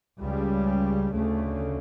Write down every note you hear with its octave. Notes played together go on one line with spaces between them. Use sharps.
C#2 C#3 G3
D2 C#3 A3